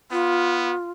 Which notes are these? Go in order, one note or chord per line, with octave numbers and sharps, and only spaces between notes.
B3 F4